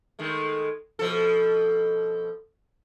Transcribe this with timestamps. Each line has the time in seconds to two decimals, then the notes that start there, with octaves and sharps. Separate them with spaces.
0.19 D#3 G#3 A3
0.99 B2 F3 A4